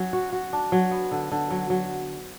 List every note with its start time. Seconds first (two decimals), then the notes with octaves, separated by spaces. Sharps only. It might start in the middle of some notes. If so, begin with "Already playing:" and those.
Already playing: F#3 C#4
0.13 F#4
0.32 F#4
0.53 D4
0.72 F#3
0.91 B3
1.12 D3
1.32 D3
1.51 F#3
1.70 F#3